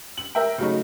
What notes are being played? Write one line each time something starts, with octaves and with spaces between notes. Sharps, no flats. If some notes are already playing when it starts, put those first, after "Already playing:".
F#7
A#4 E5 G5
C#3 F#3 A3 D#4